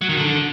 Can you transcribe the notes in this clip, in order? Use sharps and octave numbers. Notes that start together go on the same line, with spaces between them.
F#3
D#3
D3